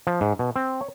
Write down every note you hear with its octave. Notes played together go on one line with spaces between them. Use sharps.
F3
G#2
B2
C4
C#5